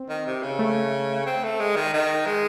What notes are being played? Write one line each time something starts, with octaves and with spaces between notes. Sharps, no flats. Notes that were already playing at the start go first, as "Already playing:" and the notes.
Already playing: C4
D#3
C3
C#3
A3
C4
A3
G#3
D#3
D#3
G#3